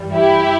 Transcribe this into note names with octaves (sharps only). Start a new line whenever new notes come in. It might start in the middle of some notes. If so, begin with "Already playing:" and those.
Already playing: G2 E3 G3
E4 G4